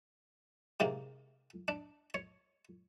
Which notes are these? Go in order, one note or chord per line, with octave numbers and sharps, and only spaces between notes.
G#2 C3 A#3
D4
C#5